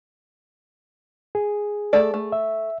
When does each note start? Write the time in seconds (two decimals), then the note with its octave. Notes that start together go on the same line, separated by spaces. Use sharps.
1.35 G#4
1.93 A3 A4 D5
2.14 A3
2.32 E5